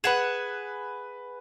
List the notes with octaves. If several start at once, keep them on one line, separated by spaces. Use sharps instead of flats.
G#4 B4 F#5 E7